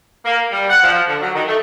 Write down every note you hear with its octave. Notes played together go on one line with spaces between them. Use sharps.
A#3
G3
F#5
F3
D3
F#3
D#3
A3